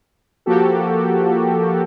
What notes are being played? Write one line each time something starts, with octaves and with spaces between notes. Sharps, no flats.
F3 A#3 F#4 G4 A4